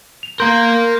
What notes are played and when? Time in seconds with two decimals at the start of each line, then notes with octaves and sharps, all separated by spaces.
0.23 F7
0.40 A#3 A#4 C6 G6